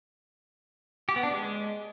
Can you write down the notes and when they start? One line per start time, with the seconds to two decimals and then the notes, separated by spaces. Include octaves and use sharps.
1.09 G4
1.16 B3
1.23 D4
1.31 G#3